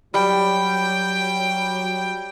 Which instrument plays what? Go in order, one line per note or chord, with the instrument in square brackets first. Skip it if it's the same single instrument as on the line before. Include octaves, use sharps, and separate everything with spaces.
[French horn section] F#3 [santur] G3 [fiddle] G5